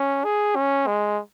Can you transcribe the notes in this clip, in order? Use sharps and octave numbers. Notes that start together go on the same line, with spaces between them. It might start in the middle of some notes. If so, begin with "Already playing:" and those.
Already playing: C#4
G#4
C#4
G#3